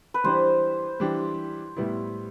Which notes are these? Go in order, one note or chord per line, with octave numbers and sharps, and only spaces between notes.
B4
E3 G3 D4 G4 C5
E3 G3 D4 G4
A2 G3 B3 E4